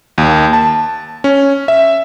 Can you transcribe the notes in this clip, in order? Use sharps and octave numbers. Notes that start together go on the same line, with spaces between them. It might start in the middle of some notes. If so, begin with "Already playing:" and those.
D#2
A5
C#4
E5